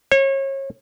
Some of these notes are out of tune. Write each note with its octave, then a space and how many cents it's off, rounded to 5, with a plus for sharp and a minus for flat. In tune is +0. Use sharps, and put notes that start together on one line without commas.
C#5 -30